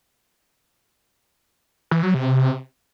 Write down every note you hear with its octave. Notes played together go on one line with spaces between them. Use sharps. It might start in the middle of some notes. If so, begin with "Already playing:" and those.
E3
F#3
C3